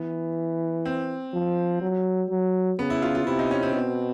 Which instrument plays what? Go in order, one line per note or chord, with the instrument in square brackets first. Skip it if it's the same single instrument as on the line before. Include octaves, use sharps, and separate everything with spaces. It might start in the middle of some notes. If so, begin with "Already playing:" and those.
Already playing: [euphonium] E3 [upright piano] B3
[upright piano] C4
[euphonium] F3
F#3
F#3
[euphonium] C#3 [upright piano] B3
[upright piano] E4
F4
F4
[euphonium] C3 [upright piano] E4
[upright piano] D#4
C#4
C4
[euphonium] B2